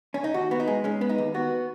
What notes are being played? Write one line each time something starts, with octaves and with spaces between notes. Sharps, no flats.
C#4
D#4
D#2 F#4
B3 F#4
D#4
G#3
G#3 C#4
B3
D#4
D#2
B3 F#4